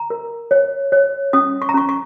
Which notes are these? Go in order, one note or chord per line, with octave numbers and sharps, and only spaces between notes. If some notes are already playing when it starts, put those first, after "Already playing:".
Already playing: A#5
A#4
C#5
C#5
C#4 D#6
C#6
A#5
C#4 C#6
C#6